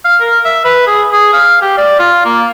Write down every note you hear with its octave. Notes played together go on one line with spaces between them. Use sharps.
F5
A#4
E5
B4
G#4
G#4
F5
G4
D5
F4
A#3